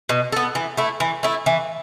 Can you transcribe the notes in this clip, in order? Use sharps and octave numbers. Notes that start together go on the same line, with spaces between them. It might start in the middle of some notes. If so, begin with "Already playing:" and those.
B2
B3 A4
E3
A3 E4
E3
A3 E4
E3